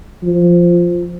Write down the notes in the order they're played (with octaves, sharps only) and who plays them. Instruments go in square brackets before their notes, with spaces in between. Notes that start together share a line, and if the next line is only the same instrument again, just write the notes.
[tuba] F3